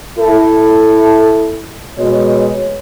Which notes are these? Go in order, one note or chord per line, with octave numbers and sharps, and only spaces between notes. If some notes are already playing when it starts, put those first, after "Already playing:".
E4 A4
B2 G#3 C#5